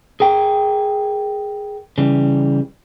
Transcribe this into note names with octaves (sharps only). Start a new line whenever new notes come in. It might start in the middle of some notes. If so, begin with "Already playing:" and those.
G#4 A#4 G5
C#3 E3 G3